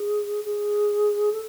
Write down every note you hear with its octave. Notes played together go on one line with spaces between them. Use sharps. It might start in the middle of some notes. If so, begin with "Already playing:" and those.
Already playing: G#4
G#4
A4